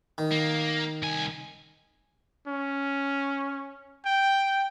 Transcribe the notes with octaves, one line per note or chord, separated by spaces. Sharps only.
D#3
A#3
C2 G#5
C#4
G5